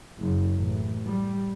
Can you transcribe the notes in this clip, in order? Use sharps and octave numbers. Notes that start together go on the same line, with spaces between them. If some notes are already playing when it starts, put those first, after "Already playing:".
F#1
A1
G3